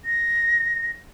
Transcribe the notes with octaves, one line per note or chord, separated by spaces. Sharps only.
A#6